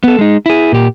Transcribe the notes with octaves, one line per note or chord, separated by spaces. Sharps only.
B3 A4
G#3 D#4
E4 G#4
A#2 G4